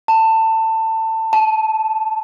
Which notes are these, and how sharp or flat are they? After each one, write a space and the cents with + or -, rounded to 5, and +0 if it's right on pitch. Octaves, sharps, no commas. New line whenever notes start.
A5 +20
A5 -15